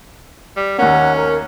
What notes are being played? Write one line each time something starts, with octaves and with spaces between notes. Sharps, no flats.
G3
D#2 A#3 C#4 F#5
A#4